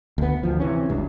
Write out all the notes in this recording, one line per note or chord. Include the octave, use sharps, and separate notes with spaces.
D2 B3
D2 F3
C3 E3 C#4
F1 C#2 G2